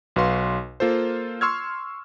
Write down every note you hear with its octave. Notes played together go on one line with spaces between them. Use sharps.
B1 F#4 B4 F5 C6
A#3 F4 A4 C5
C6 C#6 E6 F6 G#6